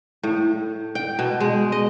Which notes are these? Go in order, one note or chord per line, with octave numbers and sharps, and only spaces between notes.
A2
G5
B2
G#3
D#5